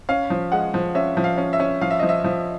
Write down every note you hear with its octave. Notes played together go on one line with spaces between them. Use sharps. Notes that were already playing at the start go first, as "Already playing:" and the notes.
C#4 F5
F3
G#3 F#5
F3
C#4 E5
F3
F5
C#4
E5
C#4
F3 F5
E5
F3 D#5
E5
F3